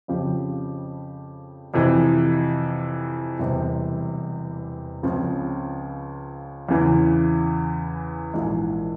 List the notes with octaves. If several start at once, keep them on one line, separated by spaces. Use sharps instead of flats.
F2 C#3 F3 C4 G4
F2 C3 E3
E1 E2 C3 G3 C4
C#2 C#3 F3 C4
E2 C#3 E3
A#1 G#2 E3 G#3